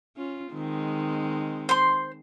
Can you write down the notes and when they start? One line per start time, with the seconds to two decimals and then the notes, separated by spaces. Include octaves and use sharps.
0.17 C#4 F4
0.52 D#3 G#3 C4
1.69 C5 C6